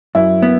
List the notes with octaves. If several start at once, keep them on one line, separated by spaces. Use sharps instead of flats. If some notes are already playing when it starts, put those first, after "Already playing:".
F#2 E4
B3